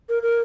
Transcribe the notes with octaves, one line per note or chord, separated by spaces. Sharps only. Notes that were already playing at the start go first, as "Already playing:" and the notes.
A#4
A#4